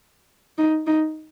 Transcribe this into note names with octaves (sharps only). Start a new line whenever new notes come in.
D#4
D#4